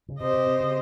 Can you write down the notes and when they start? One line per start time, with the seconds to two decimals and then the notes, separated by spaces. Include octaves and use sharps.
0.08 C#3
0.20 C3 C4 G4 C5 D#5
0.33 C3
0.46 C3
0.60 C#3